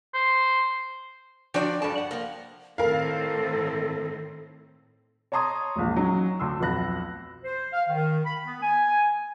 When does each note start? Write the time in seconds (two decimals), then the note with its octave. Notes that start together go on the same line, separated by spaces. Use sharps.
0.14 C5
1.54 F3 D4 F#4 D5 G5
1.82 G2 A4 A5
1.98 F#5
2.11 F3 A#3
2.78 A2 D#3 C4 A4 A#4 F5
5.32 C#5 A5 A#5 C6 D#6 G#6
5.76 E1 A#1
5.96 F#3 C#4 D#4
6.40 D2 C6 E6
6.60 B1 F2 B4 B5 F#6 A#6
7.44 C5
7.73 F5
7.89 D#3
8.25 B5
8.45 B3
8.63 G#5